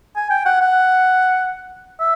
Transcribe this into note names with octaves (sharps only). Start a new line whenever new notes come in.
G#5
G5
F#5
F#5
E5